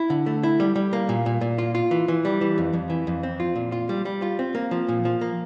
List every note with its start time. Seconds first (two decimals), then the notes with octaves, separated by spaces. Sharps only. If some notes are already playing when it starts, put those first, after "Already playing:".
Already playing: E4
0.10 D3
0.26 A3
0.43 E4
0.60 G3
0.76 G3
0.93 A#3
1.09 A#2
1.26 A#2
1.41 A#2
1.58 F4
1.75 F4
1.91 E3
2.08 E3
2.25 G3
2.41 E3
2.58 F2
2.73 F2
2.90 E3
3.07 F2
3.23 C4
3.40 F4
3.56 A#2
3.72 F4
3.89 G3
4.05 G3
4.22 F4
4.39 C4
4.55 A#3
4.71 F3
4.88 A#2
5.05 F3
5.21 A#3